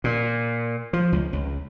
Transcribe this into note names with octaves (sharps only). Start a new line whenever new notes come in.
A#2
F3
C#2
C#2